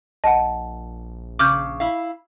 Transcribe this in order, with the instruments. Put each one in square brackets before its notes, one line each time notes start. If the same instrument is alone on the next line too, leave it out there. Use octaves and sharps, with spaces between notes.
[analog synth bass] A#1 [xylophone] D#5 F#5 [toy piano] A5
[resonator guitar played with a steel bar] C#3 [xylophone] D6 F6 G6
[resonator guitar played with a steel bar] E4 F5